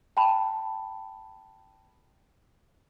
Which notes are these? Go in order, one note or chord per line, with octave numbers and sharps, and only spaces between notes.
G5 A5 B5